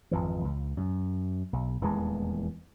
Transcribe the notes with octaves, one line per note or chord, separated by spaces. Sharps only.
G#1 F2 E3
C#2
F#2
B1
D#1 E2 E3 G#3